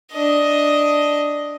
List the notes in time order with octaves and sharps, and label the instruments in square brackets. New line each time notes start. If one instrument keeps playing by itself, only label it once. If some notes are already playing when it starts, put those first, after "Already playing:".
[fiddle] D4 D#5